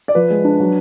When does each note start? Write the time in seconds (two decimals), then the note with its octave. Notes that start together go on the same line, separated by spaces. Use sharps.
0.08 D5
0.15 F3 B4
0.30 G#3
0.45 D4
0.60 F#3